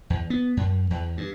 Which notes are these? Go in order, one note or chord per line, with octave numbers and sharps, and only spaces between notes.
E2
B3
F#2
E2
G2